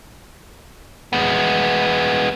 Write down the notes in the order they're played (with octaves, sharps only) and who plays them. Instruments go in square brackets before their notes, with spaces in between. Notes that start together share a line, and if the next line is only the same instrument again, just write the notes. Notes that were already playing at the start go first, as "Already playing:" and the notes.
[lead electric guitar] G#3 B3